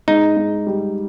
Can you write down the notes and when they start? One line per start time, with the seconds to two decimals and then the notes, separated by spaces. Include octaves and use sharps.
0.08 G#2 D#4
0.37 G#2
0.67 G3